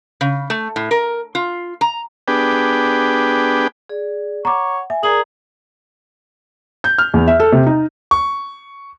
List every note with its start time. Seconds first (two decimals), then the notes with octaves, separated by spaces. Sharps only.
0.21 C#3
0.50 A3
0.76 A2
0.91 A#4
1.35 F4
1.81 A#5
2.28 B3 D4 G4 G#4 B4 G5
3.89 G#4 D5
4.45 C#5 F#5 A#5 D6
4.90 E5 G#5
5.03 G#4 A#4 D5 A#5 F#7
6.84 G6
6.98 F6
7.14 E2
7.28 E5
7.40 A4
7.52 C3
7.67 D#4
8.11 C#6